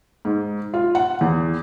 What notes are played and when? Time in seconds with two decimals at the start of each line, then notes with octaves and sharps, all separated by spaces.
0.25 G#2
0.74 F4
0.95 F#5
1.21 E2